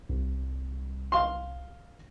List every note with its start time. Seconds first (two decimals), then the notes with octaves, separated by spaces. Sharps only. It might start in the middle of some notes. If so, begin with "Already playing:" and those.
0.09 C2
1.12 F5 C6